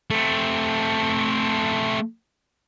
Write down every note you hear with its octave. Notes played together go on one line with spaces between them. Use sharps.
A3 C4